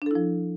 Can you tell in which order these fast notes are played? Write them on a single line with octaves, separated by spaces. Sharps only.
D4 A4 E4 F3